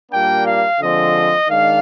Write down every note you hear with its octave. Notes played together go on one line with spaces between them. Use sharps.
A#2 G3 A#3 D4 G5
F5
D3 F3 G#3 C4 D#5
D#3 G#3 D4 F5